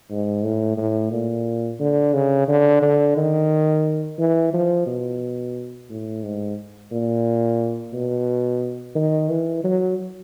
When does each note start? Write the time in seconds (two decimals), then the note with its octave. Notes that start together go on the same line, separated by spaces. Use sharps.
0.10 G#2
0.43 A2
0.77 A2
1.12 A#2
1.80 D3
2.14 C#3
2.48 D3
2.82 D3
3.16 D#3
4.18 E3
4.53 F3
4.86 B2
5.89 A2
6.23 G#2
6.92 A#2
7.93 B2
8.95 D#3
9.29 E3
9.64 F#3